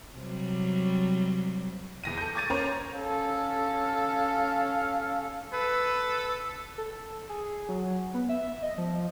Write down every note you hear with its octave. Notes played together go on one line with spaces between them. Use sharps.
C3 F#3 G3
E2 A#6 D#7
A4 G6
C#6 D6 G#6 A6 D#7
C#4 A#4 C5 C#5 A#5
C#4 A4 F5
A4 B4
A4
G#4
F#3
B3
E5
D#5
F3